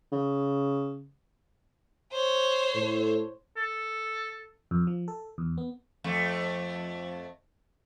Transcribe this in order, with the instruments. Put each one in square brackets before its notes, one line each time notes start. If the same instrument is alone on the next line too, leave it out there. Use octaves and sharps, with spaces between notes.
[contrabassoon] C#3
[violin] C5 C#5
[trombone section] A2 A4
[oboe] A4
[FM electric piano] F2
F3
A4
E2
B3
[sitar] F2 A3